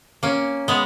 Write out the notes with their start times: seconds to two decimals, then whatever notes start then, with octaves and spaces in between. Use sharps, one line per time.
0.23 A#3 C#4
0.68 G#3 B3